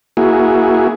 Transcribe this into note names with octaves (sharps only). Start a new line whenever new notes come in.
A#3 E4 F#4 G#4